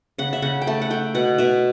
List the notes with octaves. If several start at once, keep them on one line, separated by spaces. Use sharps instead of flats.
C#3 F#5
E5
C#3 F#5
G5
A3 A5
F#5
A3 G5
B2 F#5
B2 E5